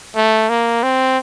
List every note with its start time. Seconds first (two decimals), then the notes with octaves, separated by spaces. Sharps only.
0.16 A3
0.50 A#3
0.83 C4